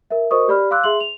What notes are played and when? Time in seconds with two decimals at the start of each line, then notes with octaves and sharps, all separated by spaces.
0.11 A#4 E5
0.31 F#4 A#4 C5 D#5 C#6 D#6
0.48 G4 D5 B5 F6
0.71 F5 C6 D6 E6 F#6
0.84 G#4 E5 C6 F#7
1.00 F7